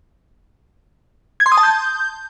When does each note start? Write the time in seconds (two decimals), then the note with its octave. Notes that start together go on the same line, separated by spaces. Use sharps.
1.40 G#6
1.46 C6
1.52 D#6
1.57 A5
1.63 G6